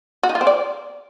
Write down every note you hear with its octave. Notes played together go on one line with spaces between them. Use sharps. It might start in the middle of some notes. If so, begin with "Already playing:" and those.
F#4
D#4
F4
C4
D5